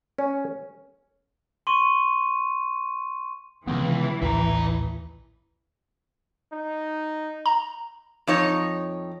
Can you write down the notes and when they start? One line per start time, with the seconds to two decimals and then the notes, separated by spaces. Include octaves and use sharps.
0.18 C#4
1.67 C6 C#6 D#7
3.67 C#2 C3 D#3 E3 B3
4.22 A#1 D#2 A2 E4 A#5
6.52 D#4
7.46 A#5
8.27 F2 D#4 C#5